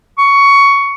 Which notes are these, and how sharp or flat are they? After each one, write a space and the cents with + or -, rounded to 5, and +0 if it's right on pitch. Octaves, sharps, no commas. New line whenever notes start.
C#6 +15